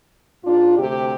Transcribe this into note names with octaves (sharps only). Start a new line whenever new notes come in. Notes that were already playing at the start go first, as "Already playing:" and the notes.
G#2 D4 F4
D2 C3 G4